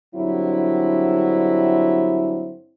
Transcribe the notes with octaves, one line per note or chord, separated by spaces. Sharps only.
G2 D3 F#3 C4 E4